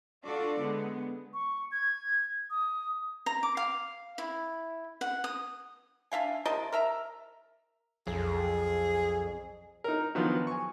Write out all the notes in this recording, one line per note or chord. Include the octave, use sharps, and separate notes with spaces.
D4 F4 F#4 A4 D5
D3 G#3 B3
C#6
G#6
D#6
A#5
D6
F5
E4
F#5
D#6
D4 E5 F5 G#5
C3 A#4 D#5 A5
A#4 E5 A#5
B1 F2 G#4
D#4 A#4
D#3 F3 F#3 B3 D4 F4
G#5 C#6